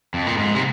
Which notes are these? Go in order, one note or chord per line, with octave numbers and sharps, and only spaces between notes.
F2
A#2
G#2
C3